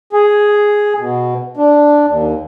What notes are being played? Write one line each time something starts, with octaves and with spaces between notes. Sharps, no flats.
G#4
B2
D4
D#2